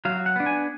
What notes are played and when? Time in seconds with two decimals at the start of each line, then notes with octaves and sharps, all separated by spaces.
0.05 F#3 F5
0.26 F#5
0.36 B3 D4
0.46 G#5